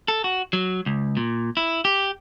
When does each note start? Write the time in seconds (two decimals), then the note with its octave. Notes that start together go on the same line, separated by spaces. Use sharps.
0.08 A4
0.24 F#4
0.53 F#3
0.86 C#2
1.17 A#2
1.57 E4
1.85 G4